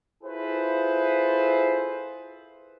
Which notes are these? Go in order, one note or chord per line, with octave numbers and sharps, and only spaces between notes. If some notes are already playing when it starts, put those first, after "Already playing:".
E4 F4 G#4 A4 B4 C5